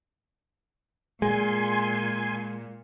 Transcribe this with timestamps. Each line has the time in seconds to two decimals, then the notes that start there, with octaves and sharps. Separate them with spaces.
1.22 A#2 G#3 G#5 C6